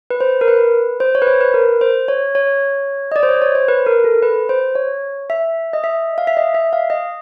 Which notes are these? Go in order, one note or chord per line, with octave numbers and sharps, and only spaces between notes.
B4
C5
A#4
B4
C5
C#5
B4
C5
B4
A#4
C5
C#5
C#5
D#5
D5
C5
C#5
C#5
C5
B4
A#4
A4
B4
C5
C#5
E5
D#5
E5
F5
E5
D#5
E5
F5
D#5